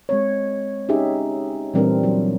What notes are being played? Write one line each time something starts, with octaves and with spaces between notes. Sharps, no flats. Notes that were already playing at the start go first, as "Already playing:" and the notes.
G#3 C4 C#5
C#4 D#4 G4 G#4 E5
A#2 E3 G3 C4 D4 A#4
F#3